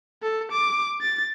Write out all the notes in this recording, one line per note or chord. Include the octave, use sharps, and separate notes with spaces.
A4
D6
A6